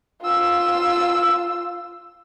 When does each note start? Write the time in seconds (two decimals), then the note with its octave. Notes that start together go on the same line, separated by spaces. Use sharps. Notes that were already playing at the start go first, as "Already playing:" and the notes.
0.21 F4 E6